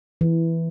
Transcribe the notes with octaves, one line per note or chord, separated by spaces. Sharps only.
E3